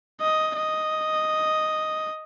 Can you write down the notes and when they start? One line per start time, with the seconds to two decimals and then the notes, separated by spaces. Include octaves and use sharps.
0.21 D#5
0.57 D#5